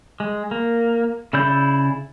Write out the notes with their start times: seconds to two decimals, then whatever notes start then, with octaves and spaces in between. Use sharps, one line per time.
0.20 G#3
0.51 A#3
1.33 C#3 E4 D5 G6